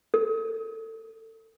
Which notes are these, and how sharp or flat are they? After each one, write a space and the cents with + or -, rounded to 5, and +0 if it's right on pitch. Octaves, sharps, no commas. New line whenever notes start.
A4 +30